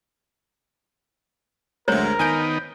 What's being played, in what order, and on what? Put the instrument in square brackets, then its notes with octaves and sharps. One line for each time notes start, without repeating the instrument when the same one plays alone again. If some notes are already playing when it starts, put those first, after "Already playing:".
[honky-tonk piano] D2 G#3 [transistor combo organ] F#3 [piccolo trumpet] A#4 [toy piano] C5 C#5 A#5
[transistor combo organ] D#3 B3 D#4 [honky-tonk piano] G#5 G6 D7